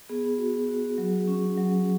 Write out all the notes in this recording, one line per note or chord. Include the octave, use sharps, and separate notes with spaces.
B3 G#4
F#4
F#4
F#3
C#4
F#3